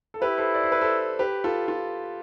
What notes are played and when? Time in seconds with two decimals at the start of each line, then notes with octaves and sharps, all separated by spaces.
0.14 A4
0.22 E4 G4 B4
0.38 A4 C5
0.54 D5
0.63 C5
0.72 B4
0.81 A4 C5
1.19 G4 B4
1.44 F4 A4
1.68 F4